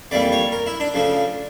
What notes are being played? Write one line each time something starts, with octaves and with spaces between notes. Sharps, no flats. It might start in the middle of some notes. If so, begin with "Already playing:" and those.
F2 E3 G3 A#3 D5
C#5
A#4
E4
D4
C#3 F3 A3